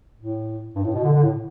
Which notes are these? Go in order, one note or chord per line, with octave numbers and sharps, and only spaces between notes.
A2
G2
A2
B2
D3
D3
A2